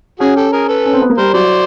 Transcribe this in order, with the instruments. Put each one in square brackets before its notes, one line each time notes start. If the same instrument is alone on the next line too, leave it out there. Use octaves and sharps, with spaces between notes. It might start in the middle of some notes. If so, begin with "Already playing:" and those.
[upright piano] C#4 [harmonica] F#4 G#4
[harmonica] G4 A4
G#4 A#4
A4 B4
[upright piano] C#4
C4
B3
A#3
[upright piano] G3 [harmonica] A#4 C5
[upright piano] F#3 [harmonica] C5 D5